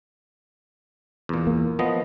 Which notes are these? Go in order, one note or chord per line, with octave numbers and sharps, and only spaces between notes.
E2 A#2
A#3
F3 B3 D#5